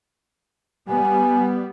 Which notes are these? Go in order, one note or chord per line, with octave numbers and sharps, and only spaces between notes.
G3 B3 G#5